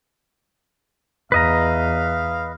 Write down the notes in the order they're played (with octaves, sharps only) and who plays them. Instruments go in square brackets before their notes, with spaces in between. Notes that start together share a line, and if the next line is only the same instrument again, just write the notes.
[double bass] E2 [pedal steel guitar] B4 D#5 A#5 [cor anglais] F5